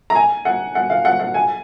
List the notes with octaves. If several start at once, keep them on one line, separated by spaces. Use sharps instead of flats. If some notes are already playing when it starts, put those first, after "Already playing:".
A#5
G#5
F#5
F#5
F5
F#5
F#5
G#5